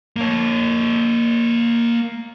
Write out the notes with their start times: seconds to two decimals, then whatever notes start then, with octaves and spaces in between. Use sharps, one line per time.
0.16 A#3 C#5